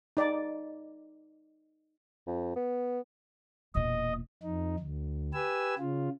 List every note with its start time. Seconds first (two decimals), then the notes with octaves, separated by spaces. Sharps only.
0.17 D#4 D5
2.27 F2
2.56 B3
3.75 E1 A#2 D#5
4.43 F2 D#4
4.79 D2
5.33 G4 B4 G#5 E6
5.79 C#3 F4